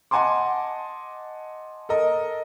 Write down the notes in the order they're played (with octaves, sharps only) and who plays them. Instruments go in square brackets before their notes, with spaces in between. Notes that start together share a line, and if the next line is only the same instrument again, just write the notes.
[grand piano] D#5 F#5 G#5 A5 C6 D6
A4 A#4 D#5